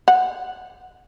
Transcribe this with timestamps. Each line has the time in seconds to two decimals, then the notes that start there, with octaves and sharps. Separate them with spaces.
0.08 F#5